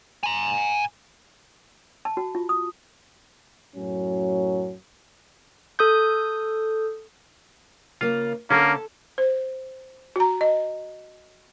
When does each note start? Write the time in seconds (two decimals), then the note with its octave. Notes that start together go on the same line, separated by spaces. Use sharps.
0.23 G#5 A#5
2.05 A5
2.17 F#4
2.35 F4
2.49 D#6
3.76 F#2 A2 F#3 C#4
5.79 A4 D#6 G6
8.01 C#3 A#3 F4
8.50 D3 A#3 C#4 A4 A5
9.18 C5
10.16 F#4 A#5
10.41 D#5